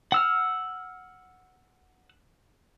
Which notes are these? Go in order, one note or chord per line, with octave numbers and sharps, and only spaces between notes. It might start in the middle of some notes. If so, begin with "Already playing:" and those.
F#5 E6 F6